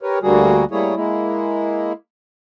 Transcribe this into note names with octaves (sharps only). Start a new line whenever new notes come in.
G4 A#4 B4 C#5
D2 D3 G3 A#3 F#4 G#4
G3 A3 A#3 E4 G#4 C#5
G#3 A#3 E4